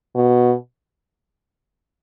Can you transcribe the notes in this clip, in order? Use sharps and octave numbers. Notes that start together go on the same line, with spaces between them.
B2